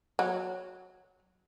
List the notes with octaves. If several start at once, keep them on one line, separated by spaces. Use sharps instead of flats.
F#3